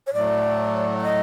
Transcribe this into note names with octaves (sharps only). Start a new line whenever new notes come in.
C#5
A2 F#3 A3 D5
D5
D#5